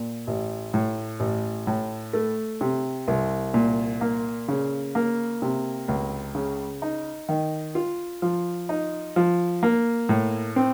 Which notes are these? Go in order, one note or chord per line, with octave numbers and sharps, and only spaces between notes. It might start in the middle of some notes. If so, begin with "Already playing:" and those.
Already playing: A#2
A1
A2
A1
A2
A3
C3
C2
A#2
A#3
C#3
A#3
C3
C#2
C#3
D#4
D#3
F4
F3
D#4
F3
A#3
A2
C4